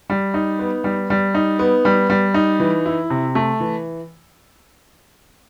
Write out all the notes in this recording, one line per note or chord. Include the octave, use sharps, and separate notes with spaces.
G3
D#4
B3
G3
G3
D#4
B3
G3
G3
D#4
E3
E4
C3
A3
E3